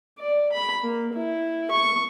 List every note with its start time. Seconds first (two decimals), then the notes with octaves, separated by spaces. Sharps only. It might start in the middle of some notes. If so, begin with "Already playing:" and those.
0.19 D5
0.52 B5
0.84 A#3
1.14 E4
1.71 C#6